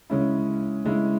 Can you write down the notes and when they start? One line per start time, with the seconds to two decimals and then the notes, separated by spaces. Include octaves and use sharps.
0.10 C#3 G#3 C#4 E4
0.84 C#3 G#3 C#4 E4